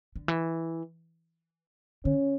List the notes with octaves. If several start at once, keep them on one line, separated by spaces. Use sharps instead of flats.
D3
E3
D3 C#4